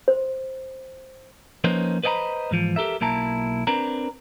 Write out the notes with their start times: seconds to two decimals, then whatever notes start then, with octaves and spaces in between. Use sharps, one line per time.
0.08 C5
1.64 F3 A#3 C#4 D#4 B4 C5
2.03 B4 C5 D#5 G5 A#5 B5
2.51 G#2 E3 F3
2.76 G4 A4 A#4 E5
3.01 B1 A#3 E4 A5 A#5
3.67 C4 D4 A#4 B4 A#5